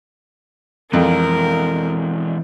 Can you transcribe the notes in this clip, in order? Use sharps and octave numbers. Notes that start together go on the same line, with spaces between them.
F2 E3 G#3 A#4